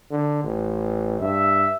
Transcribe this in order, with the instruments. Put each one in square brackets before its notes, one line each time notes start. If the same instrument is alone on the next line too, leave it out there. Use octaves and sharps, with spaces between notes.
[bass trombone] D3
A1
[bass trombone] G2 [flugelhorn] E5